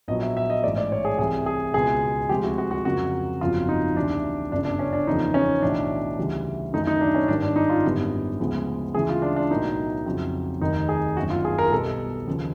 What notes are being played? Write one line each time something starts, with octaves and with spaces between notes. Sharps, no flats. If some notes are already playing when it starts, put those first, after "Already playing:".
A#1 A#2 F#3 B3 D#5
E5
E5
D#5
A1 G#2 E3 A3 D5
D5
C#5
G#4
C2 C3 E3 G#4
G#4
C#2 B2 G#3 B3 G#4
D2 C3 F3 G#3 G4
F#4
F#4
F#4
F2 C#3 F#3 A#3 F#4
G1 F2 C#3 F#3 F4
D#4
D2 C3 E3 D4
G1 F#2 C#3 D4
D4
C#4
D4
E2 C#3 F3 A#3 D#4
C#4
B1 A2 E3 D4
D2 C#3 E3 G3
F#2 D#3 F#3 A3 D#4
D#4
D4
C#4
G#1 G2 D#3 D4
D4
D#4
F4
G#1 F#2 D3 G3 B3
D2 C#3 F3 G#3 B3
D2 C#3 E3 G#3 G#4
F4
D4
D4
B1 A2 F#3 A#3 D#4
F2 C#3 F#3
F1 D#2 D#3 D#4
G#4
G1 F#2 D#3 F#3 A#3 F#4
F4
G#4
A#4
B1 B2 G3 B3 A4
D#2 C#3 F3